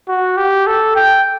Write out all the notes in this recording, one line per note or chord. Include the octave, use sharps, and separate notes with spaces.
F#4
G4
A4
G5